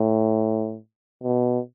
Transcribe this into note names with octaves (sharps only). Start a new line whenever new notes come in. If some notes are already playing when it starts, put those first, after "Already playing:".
Already playing: A2
B2